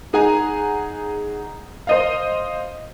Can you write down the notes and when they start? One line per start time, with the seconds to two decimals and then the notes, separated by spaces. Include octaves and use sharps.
0.13 D#4 G#4 F#5 G#5 A#5
1.87 C5 D#5 F5